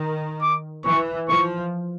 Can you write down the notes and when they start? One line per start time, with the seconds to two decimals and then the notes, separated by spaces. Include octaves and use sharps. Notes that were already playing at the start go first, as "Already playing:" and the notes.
Already playing: D#3
0.41 D6
0.85 E3 C#6
1.29 F3 C#6